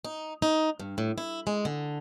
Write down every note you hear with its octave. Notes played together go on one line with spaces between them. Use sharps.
D#4
D#4
G2
A2
E4
G#3
D3